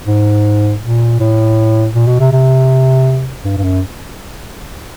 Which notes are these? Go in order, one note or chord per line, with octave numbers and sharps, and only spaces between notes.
G#2
A#2
A2
A#2
B2
C3
C3
G2
G2
F#2